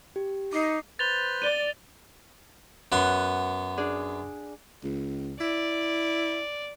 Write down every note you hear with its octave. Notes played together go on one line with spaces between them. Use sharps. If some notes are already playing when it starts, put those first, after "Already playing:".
G4
D#4 D6 C7
B4 C5 A6 F7 G7
D5 D#7 G7
F#2 B3 F#5 C6
D4 G#4
C#2
E4 D5